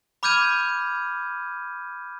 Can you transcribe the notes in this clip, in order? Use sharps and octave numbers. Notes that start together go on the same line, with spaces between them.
B5 D6 F6 G6 G#6 D#7